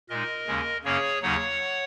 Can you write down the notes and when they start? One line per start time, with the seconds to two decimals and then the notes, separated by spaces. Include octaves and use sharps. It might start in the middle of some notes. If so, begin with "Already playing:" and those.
0.09 A#2 G#3 D#4 A#4 D#5
0.47 D#2 C#3 G#3 C#4
0.84 F#2 C#3 A#3 C#4 G#4 C#5
1.22 D#2 C#3 F#3 D#4 C#5 F#5